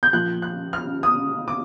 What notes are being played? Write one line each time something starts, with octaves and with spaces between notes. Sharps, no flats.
G6
A#1 A#2 F3 F#6
F#6
F6
D#6
D6